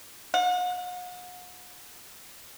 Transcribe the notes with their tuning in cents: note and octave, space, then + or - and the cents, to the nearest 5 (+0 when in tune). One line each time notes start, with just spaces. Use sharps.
F#5 -45